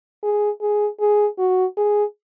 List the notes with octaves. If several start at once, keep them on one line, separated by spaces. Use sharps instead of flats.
G#4
G#4
G#4
F#4
G#4